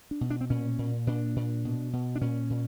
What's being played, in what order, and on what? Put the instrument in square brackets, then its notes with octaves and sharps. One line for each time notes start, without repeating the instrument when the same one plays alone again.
[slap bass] D4
B2
D4
C4
A#2 C#4
A#2
A#2 D4
A#2
B2
B2
D4
A#2 C#4
A#2